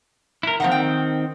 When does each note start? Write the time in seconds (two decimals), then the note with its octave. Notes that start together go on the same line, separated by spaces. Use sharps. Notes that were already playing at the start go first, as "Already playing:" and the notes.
0.43 E4 A#4
0.60 D#3 F3 A#3 C4 F#5
0.72 G5